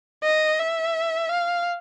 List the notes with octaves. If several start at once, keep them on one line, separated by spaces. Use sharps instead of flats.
D#5
E5
F5